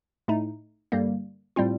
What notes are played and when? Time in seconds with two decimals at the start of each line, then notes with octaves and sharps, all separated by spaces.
0.28 A2 A3 D#4
0.92 G2 D3 G3 A#3
1.56 A2 G3 C4 F4